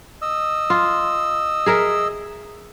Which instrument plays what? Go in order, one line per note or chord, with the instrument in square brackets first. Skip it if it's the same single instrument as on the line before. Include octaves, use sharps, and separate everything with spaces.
[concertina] D#5 E6
[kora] F4
G#4 A#4 E5